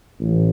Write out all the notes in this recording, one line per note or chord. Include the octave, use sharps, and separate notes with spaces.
A1